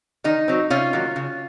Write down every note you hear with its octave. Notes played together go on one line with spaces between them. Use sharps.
D#3 D#4
F#3 C4
C3 C#4 F4
D#3 F#3 A#3
C#3